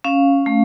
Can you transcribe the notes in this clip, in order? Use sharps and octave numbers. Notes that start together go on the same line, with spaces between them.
C#4 F5
A3